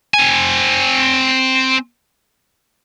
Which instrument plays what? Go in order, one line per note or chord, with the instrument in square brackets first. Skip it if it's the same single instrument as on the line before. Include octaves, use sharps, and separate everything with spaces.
[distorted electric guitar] C4 G#5